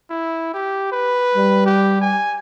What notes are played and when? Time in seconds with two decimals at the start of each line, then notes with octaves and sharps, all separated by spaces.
0.10 E4
0.54 G4
0.92 B4
1.35 G3
1.66 G4
2.01 G#5